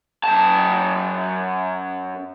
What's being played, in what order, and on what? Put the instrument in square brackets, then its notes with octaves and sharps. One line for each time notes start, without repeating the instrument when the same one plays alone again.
[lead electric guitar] F#2 A5